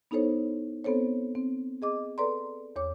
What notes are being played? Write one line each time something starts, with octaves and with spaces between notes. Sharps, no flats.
B3 D#4 E4 A4 C5 C#5
B3 C4 A4 C5 C#5
C4
G#4 D#5 D6
A4 B4 D5 A#5 C6
E2 C#5 D6